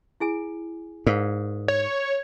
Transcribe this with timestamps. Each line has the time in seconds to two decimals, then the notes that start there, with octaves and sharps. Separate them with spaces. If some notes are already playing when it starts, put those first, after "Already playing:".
0.20 E4 G#4 G#5
1.07 G#2 A#4 D5 F5
1.68 C#5